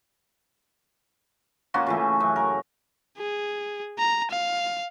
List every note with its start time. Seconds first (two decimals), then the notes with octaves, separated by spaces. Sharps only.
1.74 A#3 C#4 F4 F#4
1.86 C#3 E3 A3
2.20 F#2
2.36 A#4
3.17 G#4
3.98 A#5
4.31 F5